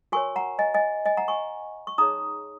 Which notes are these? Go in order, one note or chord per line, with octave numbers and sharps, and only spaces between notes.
F#4 A#4 C#5 G#5 C#6
F#5 A#5
D#5 G#5
D#5 G#5
D#5 G#5
F#5 A#5
G#5 C#6
C#6
D#4 G#4 C#5 A#5 D#6